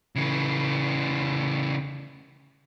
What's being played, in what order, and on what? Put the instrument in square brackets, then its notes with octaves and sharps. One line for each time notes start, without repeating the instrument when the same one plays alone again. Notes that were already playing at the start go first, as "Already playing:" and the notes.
[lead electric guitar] C#3 E3